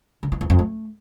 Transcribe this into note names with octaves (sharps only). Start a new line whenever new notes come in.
D3
E3
E2
F2
A3